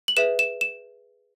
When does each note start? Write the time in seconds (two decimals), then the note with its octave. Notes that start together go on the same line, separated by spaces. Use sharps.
0.08 F#7
0.17 G#4 B4 E5 E7
0.39 E7
0.61 E7